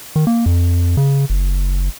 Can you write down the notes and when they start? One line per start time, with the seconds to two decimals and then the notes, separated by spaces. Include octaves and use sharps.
0.16 D#3
0.27 A#3
0.46 F2
0.97 C#3
1.30 F#1